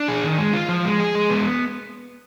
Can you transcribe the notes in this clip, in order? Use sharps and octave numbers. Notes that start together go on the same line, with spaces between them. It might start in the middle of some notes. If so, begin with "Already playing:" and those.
Already playing: D4
G#4
D#3
G#3
F4
F3
G#3
G#4
G#3
B3